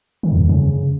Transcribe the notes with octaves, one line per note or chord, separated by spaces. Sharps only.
D#3
E2
F2
C#3